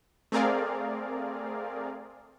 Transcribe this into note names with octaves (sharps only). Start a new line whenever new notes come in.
A3 C4 G#4 A#4 D5 F5